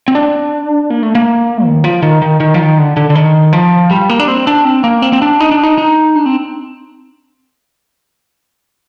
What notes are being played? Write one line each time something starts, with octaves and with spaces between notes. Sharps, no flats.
C4
D4
A#3
A3
A#3
D#3
F3
D#3
D#3
D#3
F3
D#3
D3
D3
D3
D#3
F3
G3
A#3
D4
C4
D4
C4
A#3
C4
C4
D4
D#4
D4
D#4
D#4
D4
C4